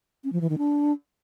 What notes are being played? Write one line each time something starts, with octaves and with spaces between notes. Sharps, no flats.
C#4
F3
E3
D#3
D4